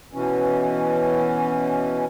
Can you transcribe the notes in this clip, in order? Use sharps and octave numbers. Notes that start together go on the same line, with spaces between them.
B2 E3 C#4